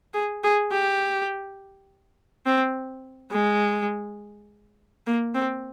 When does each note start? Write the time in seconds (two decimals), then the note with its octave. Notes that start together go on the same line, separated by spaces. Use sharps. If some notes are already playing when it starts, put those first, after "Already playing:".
0.14 G#4
0.44 G#4
0.72 G4
2.46 C4
3.32 G#3
5.07 A#3
5.35 C4